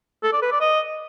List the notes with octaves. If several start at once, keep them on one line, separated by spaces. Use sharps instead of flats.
A4
D5
B4
D5
D#5